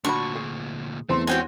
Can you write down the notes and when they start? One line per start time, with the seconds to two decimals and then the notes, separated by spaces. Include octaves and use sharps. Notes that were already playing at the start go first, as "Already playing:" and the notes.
0.04 D2 A#2 D4 F#4 B5 C#6
0.35 G#4
1.09 E2 A3 C4 C6
1.27 G#3 C4 D#4 F#4 G4 C#5 G5 G#5